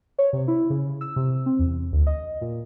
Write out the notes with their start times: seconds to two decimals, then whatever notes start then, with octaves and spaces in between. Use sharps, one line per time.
0.19 C#5
0.33 C3
0.48 E4
0.70 C#3
1.01 E6
1.16 C3
1.46 C4
1.59 E2
1.92 D2
2.07 D#5
2.41 A#2